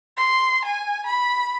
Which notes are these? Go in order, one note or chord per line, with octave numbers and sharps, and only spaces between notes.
C6
G#5
B5